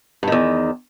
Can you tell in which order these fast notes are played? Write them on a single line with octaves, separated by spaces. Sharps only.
G2 D#3 E2